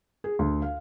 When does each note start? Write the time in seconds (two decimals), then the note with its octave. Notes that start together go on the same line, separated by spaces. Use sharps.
0.24 G#4
0.39 D2
0.62 F5